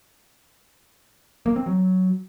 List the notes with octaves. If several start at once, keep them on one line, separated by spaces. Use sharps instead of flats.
A#3
C4
F#3